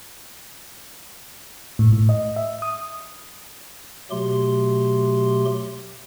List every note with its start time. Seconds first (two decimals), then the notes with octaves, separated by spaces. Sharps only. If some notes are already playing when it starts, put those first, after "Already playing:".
1.79 A2
1.92 A2
2.09 D#5
2.36 E5
2.62 D#6
4.11 B2 F#3 A3 G4 C6